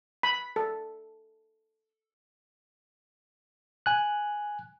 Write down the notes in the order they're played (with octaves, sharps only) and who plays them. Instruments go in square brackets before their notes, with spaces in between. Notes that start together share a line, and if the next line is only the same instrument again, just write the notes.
[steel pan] B5
A4
[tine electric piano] G#5 F#6